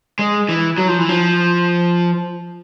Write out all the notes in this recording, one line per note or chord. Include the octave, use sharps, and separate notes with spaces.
G#3
E3
F#3
F3
E3
F3